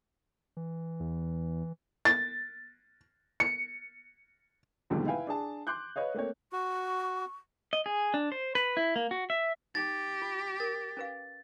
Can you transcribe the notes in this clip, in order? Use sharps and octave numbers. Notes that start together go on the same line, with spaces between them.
E3
E2
A6
C#7
A#1 D#2 G#2 B2 D3 G3
E4 B4 F5 G5 G#5
D4 G#4 A5
C6 D6 F#6 G6
B4 C#5 D#5 F5
A3 A#3 C4 C#5
F#4 C#6
D#5
G#4
D4
C5
B4
E4
A#3
F#4
E5
D#4 G4 A6
F4
A#4 A6
C#4 B4 F5